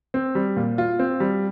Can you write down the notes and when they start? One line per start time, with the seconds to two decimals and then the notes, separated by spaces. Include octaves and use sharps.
0.14 C4
0.35 G3
0.57 A#2
0.78 F4
0.99 C4
1.20 G3